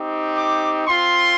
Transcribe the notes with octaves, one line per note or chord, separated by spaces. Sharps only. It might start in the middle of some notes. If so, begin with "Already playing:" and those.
Already playing: C4 D#4 G4
D6
C4 F4 C6